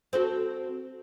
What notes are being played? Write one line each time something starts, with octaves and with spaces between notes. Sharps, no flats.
C4 F#4 A4